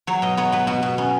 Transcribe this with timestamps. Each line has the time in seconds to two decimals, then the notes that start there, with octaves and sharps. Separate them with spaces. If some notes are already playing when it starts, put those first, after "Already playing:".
0.07 F#3 C#5
0.22 B2 D#5
0.37 B3 C#5
0.52 B3 B4
0.67 B2 F#4
0.82 B2
0.98 B3 C#4